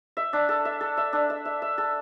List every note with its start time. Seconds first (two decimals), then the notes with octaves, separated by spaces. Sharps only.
0.17 E5
0.33 D4
0.49 A4
0.65 E5
0.81 A4
0.97 E5
1.13 D4
1.30 E5
1.45 E5
1.62 E5
1.78 A4